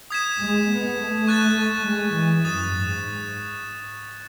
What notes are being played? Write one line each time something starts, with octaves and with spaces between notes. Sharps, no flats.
D#6 G#6 B6 E7
G#3
B3
A3
C#6 F#6 A6 E7
G#3
E3
F#2 D#6 A6 E7
G#2